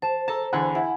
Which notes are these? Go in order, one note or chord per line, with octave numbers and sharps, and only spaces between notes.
C5 A5 E7
A4 A5 A#5
E2 D3 F#5 G#5 B5
E4 F#5